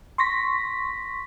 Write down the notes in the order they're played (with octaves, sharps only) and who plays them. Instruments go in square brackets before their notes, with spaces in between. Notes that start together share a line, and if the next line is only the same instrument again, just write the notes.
[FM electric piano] C6 C#6 A#6 B6